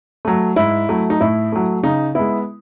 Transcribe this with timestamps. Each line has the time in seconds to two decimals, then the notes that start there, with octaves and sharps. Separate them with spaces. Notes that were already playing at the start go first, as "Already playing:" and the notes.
0.25 F#3 A3
0.56 G#2 E4
0.89 F#3 A3
1.10 D#4
1.21 A2 E4
1.52 F#3 A3
1.83 C#3 D#4
2.15 G#3 B3 E4